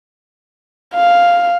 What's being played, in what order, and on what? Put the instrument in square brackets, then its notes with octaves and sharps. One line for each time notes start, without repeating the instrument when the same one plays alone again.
[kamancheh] F5